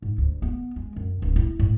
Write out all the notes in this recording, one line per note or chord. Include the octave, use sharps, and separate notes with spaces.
G#2
D2
B3
G#3
F#2
D1
E4
A2